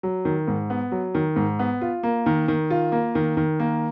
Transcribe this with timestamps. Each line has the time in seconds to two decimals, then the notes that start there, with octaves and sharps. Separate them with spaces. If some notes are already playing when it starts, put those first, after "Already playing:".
0.03 F#3
0.25 D#3
0.48 G#2
0.70 B3
0.92 F#3
1.14 D#3
1.36 G#2
1.59 B3
1.81 F4
2.03 A#3
2.26 D#3
2.48 D#3
2.70 F4
2.92 A#3
3.15 D#3
3.37 D#3
3.60 A#3